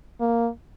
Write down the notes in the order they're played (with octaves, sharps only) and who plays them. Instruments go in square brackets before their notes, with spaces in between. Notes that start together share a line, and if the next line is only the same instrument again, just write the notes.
[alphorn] A#3